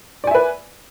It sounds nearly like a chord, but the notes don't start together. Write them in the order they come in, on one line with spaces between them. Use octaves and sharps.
D5 G#5 E5 B4